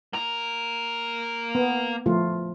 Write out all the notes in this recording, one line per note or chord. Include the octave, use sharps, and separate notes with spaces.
A#3 A#4
B3
F3 A3 F4